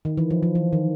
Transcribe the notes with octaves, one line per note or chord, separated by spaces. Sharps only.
D#3
E3
F3
F3
E3
D#3